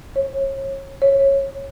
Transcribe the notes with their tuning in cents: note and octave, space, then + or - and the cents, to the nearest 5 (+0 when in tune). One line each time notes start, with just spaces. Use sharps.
C#5 -30
C#5 -15